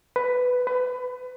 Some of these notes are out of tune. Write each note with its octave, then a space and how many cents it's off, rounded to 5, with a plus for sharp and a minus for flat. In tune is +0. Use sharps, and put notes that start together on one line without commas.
B4 +10
B4 +25